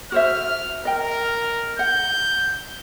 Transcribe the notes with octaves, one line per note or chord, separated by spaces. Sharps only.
F#4 C5 E5 F6
A#4 D#5 G5
F#5 G6